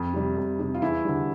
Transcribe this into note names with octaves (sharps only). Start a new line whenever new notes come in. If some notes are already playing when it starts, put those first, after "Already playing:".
Already playing: F2
C3 G3
F2
C3 G3
F4
E2 E4
D3 G3